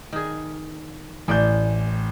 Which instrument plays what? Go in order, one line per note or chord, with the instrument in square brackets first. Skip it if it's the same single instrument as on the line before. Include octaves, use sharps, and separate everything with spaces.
[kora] D#3 G#4
[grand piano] A1 G6 [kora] A2 D5